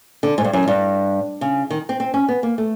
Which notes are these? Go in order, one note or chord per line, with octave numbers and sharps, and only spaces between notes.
D3
G#2
G2
F#2
G2
C#3
D#3
C4
C4
C#4
B3
A#3
A3